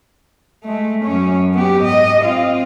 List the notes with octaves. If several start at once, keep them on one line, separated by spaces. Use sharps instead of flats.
G#3 A3
F#2 C#4
B3 G4
G#2 D#5
C4 F4